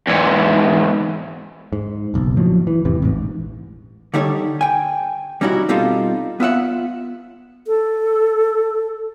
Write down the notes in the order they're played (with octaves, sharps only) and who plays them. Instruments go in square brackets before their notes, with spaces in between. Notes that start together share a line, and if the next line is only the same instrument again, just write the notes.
[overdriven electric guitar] E2 G#2
[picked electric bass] G#2
F#1 B1
A#1 A2 F3 F#3
E3
E1 G#2 C3 E3
A1 G#2
[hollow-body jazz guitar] D3 G3 D#4 G4 A4 C#5
G5 G#5
G3 C#4 D#4 E4 F#4
B2 G3 C4 D#4 F4 A4
B3 F4 E5 F#5
[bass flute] A4